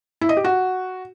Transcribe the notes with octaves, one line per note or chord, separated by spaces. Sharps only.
E4
D#5
G4
F#4